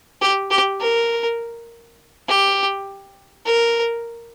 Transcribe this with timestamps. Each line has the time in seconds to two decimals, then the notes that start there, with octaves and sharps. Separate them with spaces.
0.22 G4
0.51 G4
0.81 A#4
2.29 G4
3.46 A#4